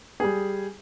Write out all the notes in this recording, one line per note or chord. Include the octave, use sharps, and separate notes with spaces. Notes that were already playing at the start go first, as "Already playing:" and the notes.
G3 G#4